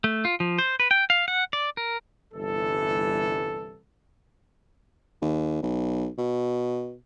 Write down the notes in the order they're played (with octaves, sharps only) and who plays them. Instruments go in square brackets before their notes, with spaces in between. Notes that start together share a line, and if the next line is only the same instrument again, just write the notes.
[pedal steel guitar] A3
F4
F3
C5
B4
G5
F5
F#5
D5
A#4
[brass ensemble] G1 C2 E3 A4
[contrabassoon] D#2
B1
B2